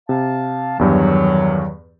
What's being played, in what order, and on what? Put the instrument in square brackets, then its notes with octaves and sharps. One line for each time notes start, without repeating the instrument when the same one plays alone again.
[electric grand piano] C3 [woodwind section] F5 A5
[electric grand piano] E2 G2 G4 [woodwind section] D#3 F#3